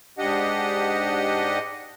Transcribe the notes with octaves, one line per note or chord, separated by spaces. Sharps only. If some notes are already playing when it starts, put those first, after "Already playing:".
G#2 D4 G4 D#5 F#5